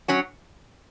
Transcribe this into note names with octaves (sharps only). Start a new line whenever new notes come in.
F#3 C#4 F#4